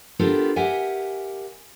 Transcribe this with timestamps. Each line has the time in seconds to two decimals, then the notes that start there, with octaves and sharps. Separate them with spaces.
0.19 B3 D4 F4 G4 A4 A#4
0.56 G4 A#4 E5 F#5 G#5